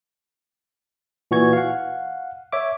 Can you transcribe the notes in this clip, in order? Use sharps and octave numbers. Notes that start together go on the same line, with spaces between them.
A#2 E3 F#4 C#6 G#6
F5 F#5
C#5 E5 D6